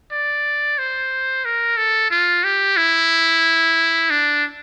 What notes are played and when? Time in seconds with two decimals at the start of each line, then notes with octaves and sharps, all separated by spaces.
0.11 D5
0.78 C5
1.45 A#4
1.77 A4
2.11 F4
2.44 G4
2.77 E4
4.10 D4